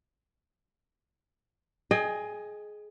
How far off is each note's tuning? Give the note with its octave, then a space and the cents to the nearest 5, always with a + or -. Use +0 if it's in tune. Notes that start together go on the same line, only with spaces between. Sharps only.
G#4 +20 D#5 +0 G5 +45